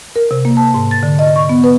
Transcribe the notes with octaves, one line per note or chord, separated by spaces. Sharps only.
A#4
C3
A#3
A5
G#2
A6
D3
D#5
C#6
B3
B4